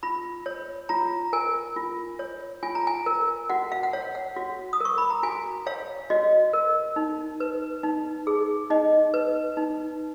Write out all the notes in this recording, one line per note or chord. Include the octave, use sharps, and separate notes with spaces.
F4 B5
C#5
F4 A#5
A#4 G#5
F4
C#5
F4 G#5
A#5
G#5
A#4
F#4 F#5
F5
F#5
C#5 F5
F#5
F#4
D#6
A#4 C#6
B5
A#5
F#4 G#5
C#5 F5
F#4 D#5
A#4
D#4
B4
D#4
G#4
D#4 D#5
B4
D#4